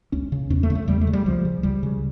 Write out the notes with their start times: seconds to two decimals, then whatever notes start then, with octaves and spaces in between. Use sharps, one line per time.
0.12 C#2 C#4
0.32 C#3
0.50 E2 C#4
0.63 A3
0.70 C#3
0.75 A3
0.88 E2 G3
1.01 A3
1.07 C#3
1.13 G3
1.26 C#2 F3
1.45 C#3
1.63 C#2 G3
1.83 C#3